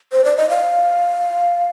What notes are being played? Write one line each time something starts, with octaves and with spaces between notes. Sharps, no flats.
C5
D5
D#5
F5